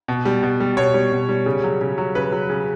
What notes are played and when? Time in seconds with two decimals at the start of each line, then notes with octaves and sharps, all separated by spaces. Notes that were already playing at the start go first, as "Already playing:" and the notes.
0.08 B2
0.25 G3
0.43 B2
0.60 G3
0.77 B2 C#5
0.94 G3
1.12 B2
1.29 G3
1.46 C#3
1.64 F#3
1.81 C#3
1.98 F#3
2.15 C#3 B4
2.32 F#3
2.50 C#3